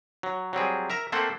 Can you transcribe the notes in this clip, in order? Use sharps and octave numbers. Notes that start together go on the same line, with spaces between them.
F#3
F#3 G3 C4 G#4
A#4 E5 A#5
A3 A#3 C4 A4 C5 F#5